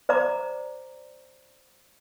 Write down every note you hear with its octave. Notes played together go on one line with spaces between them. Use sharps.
C5 D5 A#5 D6